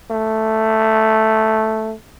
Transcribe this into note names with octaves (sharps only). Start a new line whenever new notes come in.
A3